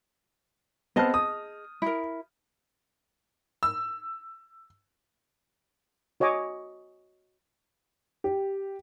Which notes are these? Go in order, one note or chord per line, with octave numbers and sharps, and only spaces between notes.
B3 C4 G#4 D#5 A5 F6
D#6
E4 A#4
E6
F#4 C#5 D#5 G#5 D6
G4